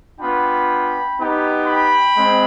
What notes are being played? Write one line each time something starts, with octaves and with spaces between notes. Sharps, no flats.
B3 D4 F4 G5 B5
B3 D#4 G4
G5 B5
G#3 C4